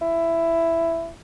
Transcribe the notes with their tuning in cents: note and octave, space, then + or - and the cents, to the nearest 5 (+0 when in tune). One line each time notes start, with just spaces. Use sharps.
E4 +10